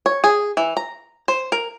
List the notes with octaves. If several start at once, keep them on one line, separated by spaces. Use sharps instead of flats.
C#5
G#4
E3
A#5
C5
A#4